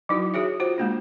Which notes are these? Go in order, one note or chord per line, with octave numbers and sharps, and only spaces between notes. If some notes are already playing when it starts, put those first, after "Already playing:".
F#3 D#4 E4 F#4
F#4 G#4 C#5 E5
F4 F#4 C5
G#3 A#3 D4